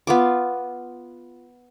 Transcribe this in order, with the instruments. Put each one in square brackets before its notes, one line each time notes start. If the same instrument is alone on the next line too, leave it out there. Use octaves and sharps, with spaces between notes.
[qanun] B3 F4 D6